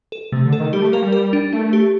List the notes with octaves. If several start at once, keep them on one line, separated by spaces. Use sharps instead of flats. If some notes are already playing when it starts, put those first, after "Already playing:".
A4
C3 A3
D3
A4
D#3
G3 G4
A3
A#3 A#4
G3
A#4
D4
A3 D4
G4